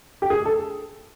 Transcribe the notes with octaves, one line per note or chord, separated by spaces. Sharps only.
G4
G#4
A4